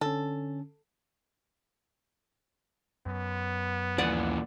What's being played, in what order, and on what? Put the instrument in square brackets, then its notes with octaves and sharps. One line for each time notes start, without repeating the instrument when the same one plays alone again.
[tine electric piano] D3 C#4 [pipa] A4
[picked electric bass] F#2 [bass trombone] B3
[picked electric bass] D#2 F3 G3 [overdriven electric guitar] A#2 E3 [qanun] D5 F#5 G#5